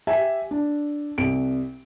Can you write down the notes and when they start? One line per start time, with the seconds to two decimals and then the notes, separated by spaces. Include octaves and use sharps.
0.07 G4 E5 G#5
0.51 D4
1.18 C2 D7